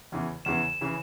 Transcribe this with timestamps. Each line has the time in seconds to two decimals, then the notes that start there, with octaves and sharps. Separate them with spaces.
0.12 E2 C#3 E3
0.45 E2 C#3 E3 E7
0.81 C#3 E3